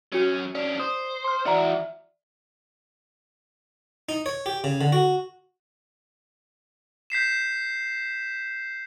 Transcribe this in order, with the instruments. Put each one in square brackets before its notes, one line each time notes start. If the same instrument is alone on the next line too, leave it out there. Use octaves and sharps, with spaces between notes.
[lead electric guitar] F#3 C#4 [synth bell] F#4 C#7 D#7
[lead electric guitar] C#4 D4 [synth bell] D5
[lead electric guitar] C5 [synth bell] D#6
[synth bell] C6 F6
[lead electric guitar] E3 F#4 [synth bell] D5 E5 A#5
[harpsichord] D#4
C#5
G4
C#3
D3
F#4
[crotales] G6 B6 C7 E7